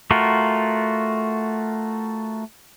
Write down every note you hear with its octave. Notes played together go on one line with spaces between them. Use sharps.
A3 F4 F#4 A#4